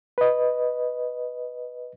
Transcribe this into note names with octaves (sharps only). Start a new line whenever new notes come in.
B4 D#5